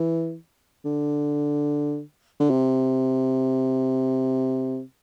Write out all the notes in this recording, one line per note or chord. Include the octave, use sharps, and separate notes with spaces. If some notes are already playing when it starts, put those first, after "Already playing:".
Already playing: E3
D3
D3
C3